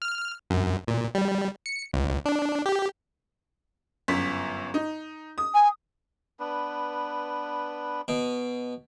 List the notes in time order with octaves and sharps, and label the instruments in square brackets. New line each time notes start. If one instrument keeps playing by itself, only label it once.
[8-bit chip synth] F6
F#2
A#2
G3
C#7
C#2
D4
G4
[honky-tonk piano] G1 F#2 B6
D#4
D#6
[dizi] G#5
[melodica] B3 D4 B4
[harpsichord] B2